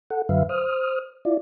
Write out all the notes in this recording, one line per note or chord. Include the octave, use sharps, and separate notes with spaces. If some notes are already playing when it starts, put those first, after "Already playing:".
A4 F#5
F#2 D3 F#3 B4 E5 F5
C5 D#6 F6
E4 F4 D5